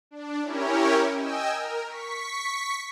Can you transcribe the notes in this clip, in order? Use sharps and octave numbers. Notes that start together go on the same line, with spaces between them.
D4
C#4 E4 G4 A#4 C#5
D#5 G5 G#5 E6
A#4
C#6 B6